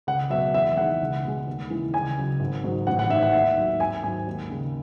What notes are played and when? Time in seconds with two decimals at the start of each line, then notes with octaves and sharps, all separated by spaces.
0.07 C#2 F#5
0.30 B2 F#3 E5
0.54 E2 E5
0.77 D#3 G#3 F#5
1.01 C#2
1.24 B2 G#3
1.47 D#2
1.70 C#3 E3 G#3
1.94 C#2 G#5
2.18 C#3 F#3
2.40 G#1
2.64 G#2 F#3
2.87 A1 F#5
2.99 F#5
3.10 G#2 E5
3.13 D#3
3.23 F#5
3.33 D#2 E5
3.56 D#3 F#3
3.80 G#1 G#5
4.03 G#2 F#3 G#5
4.27 D#2
4.50 C#3 G#3